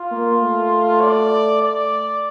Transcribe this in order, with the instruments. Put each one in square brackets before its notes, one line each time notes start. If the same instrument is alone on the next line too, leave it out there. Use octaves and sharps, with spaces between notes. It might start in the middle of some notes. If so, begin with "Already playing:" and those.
Already playing: [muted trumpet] F4
[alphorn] A#3
A3
[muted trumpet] D5
D5